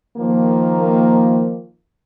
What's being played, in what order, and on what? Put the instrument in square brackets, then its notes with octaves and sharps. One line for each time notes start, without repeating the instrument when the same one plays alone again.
[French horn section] D#3 F3 A#3